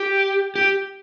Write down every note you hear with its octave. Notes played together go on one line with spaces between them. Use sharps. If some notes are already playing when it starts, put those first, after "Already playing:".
Already playing: G4
G4